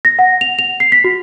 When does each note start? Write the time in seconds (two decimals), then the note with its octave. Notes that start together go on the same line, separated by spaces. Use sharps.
0.05 A#6
0.19 F#5
0.41 F7
0.59 F7
0.80 C7
0.92 B6
1.04 F#4